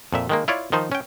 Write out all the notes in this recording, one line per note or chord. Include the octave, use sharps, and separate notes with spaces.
F2 A#2 E5
D#3 G#3 A#3
E4 F4 C#5 D5
D#3 F3 D#4 C5
C#4 G5